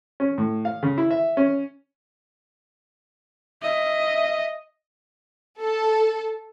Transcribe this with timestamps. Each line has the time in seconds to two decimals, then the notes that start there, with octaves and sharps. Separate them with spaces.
0.20 C#4
0.38 A2
0.65 F5
0.83 C#3
0.98 E4
1.11 E5
1.37 C#4
3.62 D#5 E5
5.60 A4